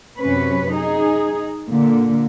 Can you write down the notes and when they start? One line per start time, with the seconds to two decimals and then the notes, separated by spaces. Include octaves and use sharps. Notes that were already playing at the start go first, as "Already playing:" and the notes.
0.19 F#2 C3 C#4 B4
0.73 D#4 G#4
1.69 A#2 D3